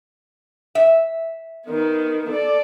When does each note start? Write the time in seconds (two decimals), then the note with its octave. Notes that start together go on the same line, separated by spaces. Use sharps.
0.75 E5
1.67 D#3 B3
2.30 A4 D5